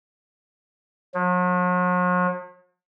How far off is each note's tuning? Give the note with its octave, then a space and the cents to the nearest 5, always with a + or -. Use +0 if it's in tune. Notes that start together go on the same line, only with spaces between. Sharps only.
F#3 -45